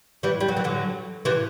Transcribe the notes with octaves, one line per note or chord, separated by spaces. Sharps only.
E3 G3
G3
F#3
E3
D3 F#3
C3 E3